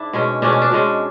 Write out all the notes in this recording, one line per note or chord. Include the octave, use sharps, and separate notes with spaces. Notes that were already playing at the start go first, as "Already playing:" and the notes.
Already playing: G#2 D4 E4
B2 G#3 C#4
B2 G#3 C#4 D4
C#4
D4
B2 G#3 C#4